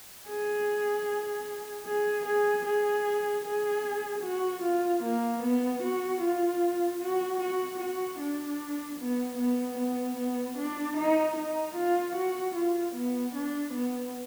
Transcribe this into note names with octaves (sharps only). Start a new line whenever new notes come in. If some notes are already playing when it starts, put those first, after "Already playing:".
G#4
G#4
G#4
G#4
G#4
F#4
F4
A#3
B3
F#4
F4
F#4
F#4
F#4
D4
B3
B3
B3
B3
D4
D#4
D#4
F4
F#4
F4
B3
D4
B3